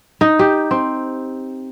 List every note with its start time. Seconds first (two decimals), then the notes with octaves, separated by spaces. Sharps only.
0.21 D#4
0.39 G4
0.71 C4